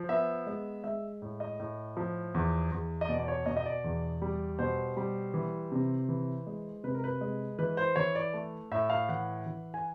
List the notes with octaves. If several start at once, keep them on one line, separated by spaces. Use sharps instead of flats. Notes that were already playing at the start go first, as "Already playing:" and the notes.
Already playing: F3
B3 E5
G#3
G#3 E5
A2
D#5
A2
F3
E2
E2
D#5
B2 D5
D5
C#5
B2 D#5
D#5
D5
E2
G3
B2 C5
G3
E3
C3
E3
G#3
C3 B4
A#4
B4
G#3
E3 B4
C5
E3 C#5
D5
A3
A2 E5
F5
E3 F#5
E3
G#5